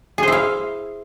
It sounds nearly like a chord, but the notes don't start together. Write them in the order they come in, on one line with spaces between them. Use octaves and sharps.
G#4 C5 E4 F5